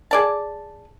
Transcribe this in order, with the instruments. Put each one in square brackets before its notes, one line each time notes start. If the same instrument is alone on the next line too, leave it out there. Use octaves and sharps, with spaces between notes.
[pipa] G#4 D5 A5